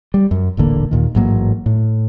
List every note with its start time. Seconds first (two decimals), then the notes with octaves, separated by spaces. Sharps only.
0.14 G3
0.31 F#2
0.57 D#1 A1 D3 A#3
0.91 D#2 A#2 D#3
1.15 A1 G#2 F#3 A#3
1.66 A2